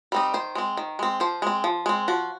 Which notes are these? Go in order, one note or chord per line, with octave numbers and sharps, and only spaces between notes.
G3 C4 D#4
D#3 C5
G#3 C4
D#3
G#3 C4
F3 C5
G#3 C4
F3
G#3 C4
F3 F#4